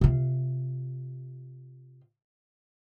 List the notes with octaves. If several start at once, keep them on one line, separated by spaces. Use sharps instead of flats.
C3 F4